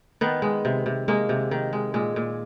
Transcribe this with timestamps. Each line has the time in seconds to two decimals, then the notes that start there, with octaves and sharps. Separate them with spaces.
0.21 D#3 B3
0.42 G#3
0.65 C3
0.86 C3
1.08 G#3 A#3
1.29 C3
1.51 D#3
1.73 G#3
1.94 A#2 G#3
2.16 A#2